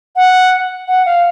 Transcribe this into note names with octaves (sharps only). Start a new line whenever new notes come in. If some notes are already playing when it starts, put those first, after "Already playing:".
F#5
F#5
F5